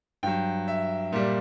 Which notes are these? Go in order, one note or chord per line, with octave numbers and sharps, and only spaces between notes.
G2 F#3 G5
E5
A#2 G3